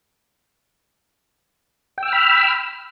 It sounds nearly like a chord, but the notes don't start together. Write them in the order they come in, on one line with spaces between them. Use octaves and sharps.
G5 E6 F6 B5